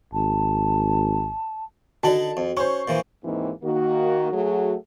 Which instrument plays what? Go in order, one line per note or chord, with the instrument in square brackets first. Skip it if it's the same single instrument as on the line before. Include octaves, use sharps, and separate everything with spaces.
[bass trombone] G#1 [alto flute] A5
[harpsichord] D3 D#4 F#5 [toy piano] F#4 D5 [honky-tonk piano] A5
[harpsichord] F2
[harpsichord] C#4 [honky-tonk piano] C5 C#6
[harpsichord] A#2 E3 F3
[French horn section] D#2 G#2 D#3 E3 A#3 C4
D#3 A#3 F#4
F#3 A3 F#4 G#4